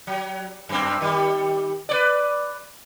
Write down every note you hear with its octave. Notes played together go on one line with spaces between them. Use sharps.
F#3
F#2 C4
D#3 G3
B4 C#5 D5